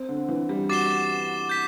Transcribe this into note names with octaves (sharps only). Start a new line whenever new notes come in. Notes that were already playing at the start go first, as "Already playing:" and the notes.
Already playing: C4
D3
E3
G3
F#4 D6 A6 C7 E7 G7
G6 B6